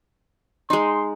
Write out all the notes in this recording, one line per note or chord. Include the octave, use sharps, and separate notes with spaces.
G#3 D#4 C6